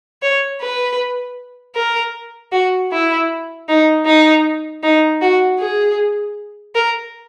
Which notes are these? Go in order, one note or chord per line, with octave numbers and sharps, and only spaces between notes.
C#5
B4
A#4
F#4
E4
D#4
D#4
D#4
F#4
G#4
A#4